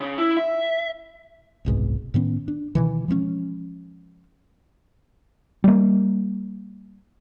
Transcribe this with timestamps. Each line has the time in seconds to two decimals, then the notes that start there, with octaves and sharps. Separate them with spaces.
0.01 C#3
0.18 E4
0.37 E5
1.65 F#1 C2 G#2 B2
2.14 A2 D#3 B3 C#4
2.48 D4
2.75 B2 D#3 E3
3.08 F3 G#3 A#3 C#4
5.64 G3 A#3